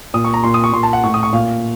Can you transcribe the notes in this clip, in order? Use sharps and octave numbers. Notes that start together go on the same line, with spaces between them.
A#2 D#6
C#6
A#5
A#2 C6
D#6
C#6
A#2 C6
A5
F#5
A2 C#6
D#6
C#6
A#2 F5